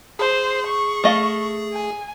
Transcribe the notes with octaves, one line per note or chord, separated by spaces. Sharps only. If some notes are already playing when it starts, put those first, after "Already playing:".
G#4 C5
C#6
A3 D#5 F5
G#5